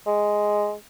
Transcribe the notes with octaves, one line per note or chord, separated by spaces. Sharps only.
G#3